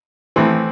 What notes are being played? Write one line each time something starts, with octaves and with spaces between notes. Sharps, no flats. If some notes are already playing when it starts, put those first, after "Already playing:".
A2 E3 C4 E4